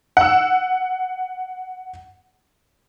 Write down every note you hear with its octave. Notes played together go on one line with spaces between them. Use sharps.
F#5 E6